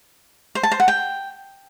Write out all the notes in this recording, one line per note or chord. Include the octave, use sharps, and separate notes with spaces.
C5
A5
C5
F#5
G5